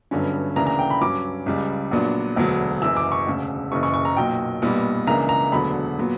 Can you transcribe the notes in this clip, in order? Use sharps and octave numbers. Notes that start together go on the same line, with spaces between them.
G1 G2 D3 F#3 C#4
D2 C#3 E3 A#3 D4 A#5
A#5
G5
B5
G2 F#3 C#4 D6
C#2 C#3 G3
A#1 A#2 F#3 B3 D4
E1 D2 D3 F#3 B3
F#1 F#2 E3 E6
D6
C#6
E1 D2 C#3
F#1 F#2 C#3 E3 C#6
C#6
C#6
A#5
B1 A#2 F#3 G5
B1 A#2 G3 B3
C#2 C#3 E3 A#3 D4 A#5
A#5
E1 D2 D3 F#3 B3 B5
A#2 F#3 B3